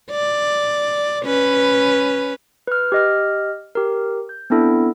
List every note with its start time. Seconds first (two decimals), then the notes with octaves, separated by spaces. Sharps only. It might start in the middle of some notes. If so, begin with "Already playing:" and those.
0.11 D5
1.23 C#4 B4
2.67 B4 F6
2.92 G4 D#5 F6
3.75 G4 A#4
4.29 G6
4.50 B3 C4 D4 E4 A4